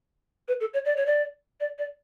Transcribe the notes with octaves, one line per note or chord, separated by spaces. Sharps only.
B4
A4
C#5
D5
C#5
D5
D5
D5